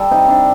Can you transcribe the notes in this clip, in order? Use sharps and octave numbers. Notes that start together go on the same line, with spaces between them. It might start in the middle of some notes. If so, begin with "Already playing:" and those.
Already playing: G3 A4
C3 D#4
C3 D4